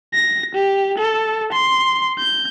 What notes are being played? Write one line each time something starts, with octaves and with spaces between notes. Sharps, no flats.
A#6
G4
A4
C6
G6